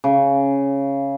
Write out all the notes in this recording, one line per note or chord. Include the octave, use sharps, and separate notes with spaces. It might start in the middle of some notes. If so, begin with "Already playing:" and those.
C#3